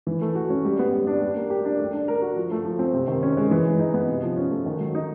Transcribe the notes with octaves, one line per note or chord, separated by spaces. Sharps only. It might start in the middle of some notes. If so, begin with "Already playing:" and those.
E3
A3
F#4
C#4
G3
B3
G3
D4
G3
A#3
G4
D4
A3
D4
A#4
F#4
F3
A3
F3
C4
C3
D#3
C#4
G#3
E3
G#3
D#4
B3
C3
F3
C#4
A3
D#3
F#3
D#4